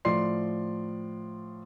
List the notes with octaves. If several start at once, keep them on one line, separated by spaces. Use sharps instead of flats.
A2 F3 D5 C6 C7